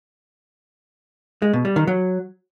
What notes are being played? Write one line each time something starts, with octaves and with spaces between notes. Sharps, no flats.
G#3
B2
G3
D#3
F#3